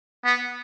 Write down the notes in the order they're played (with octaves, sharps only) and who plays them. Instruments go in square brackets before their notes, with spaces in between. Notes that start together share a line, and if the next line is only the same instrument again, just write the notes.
[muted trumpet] B3